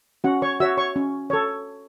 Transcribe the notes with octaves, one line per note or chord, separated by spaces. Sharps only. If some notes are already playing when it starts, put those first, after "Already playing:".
C#4 F#4 F#5
C#5 C#6
F#4 C#5 E5 E6
C#5 C#6
C#4
A4 C#5